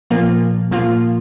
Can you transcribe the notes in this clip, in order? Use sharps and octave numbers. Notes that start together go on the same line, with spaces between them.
A#2 F3 A#3 F4
A#2 F3 A#3 F4